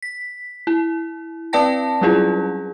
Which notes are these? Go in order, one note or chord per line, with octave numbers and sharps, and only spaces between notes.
B6
E4
C4 B4 D5 G5 A5 A#6
F#3 G3 C#4 E4 F4 G#4